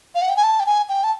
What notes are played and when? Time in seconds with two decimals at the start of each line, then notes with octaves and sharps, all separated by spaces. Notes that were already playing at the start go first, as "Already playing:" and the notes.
0.15 F5
0.22 F#5
0.29 G5
0.36 G#5
0.43 A5
0.60 G5
0.66 G#5
0.89 G5
1.04 A5